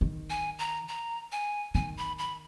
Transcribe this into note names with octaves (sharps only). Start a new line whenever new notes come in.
D#3
G#5
A#5
A#5
G#5
D#3 G#5
B5
B5